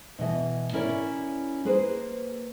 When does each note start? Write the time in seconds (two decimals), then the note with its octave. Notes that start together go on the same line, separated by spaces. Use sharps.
0.19 B2 E3 D#5
0.73 C#4 E4 A#4 C#5 D5
1.65 A#3 G#4 B4 C5